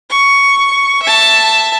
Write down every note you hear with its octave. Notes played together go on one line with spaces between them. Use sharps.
C#6
E5 A5